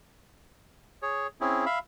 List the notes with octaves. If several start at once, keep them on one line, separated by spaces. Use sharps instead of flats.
G#4 C#5
C4 C#4 E4 G#4
E5 F5 B5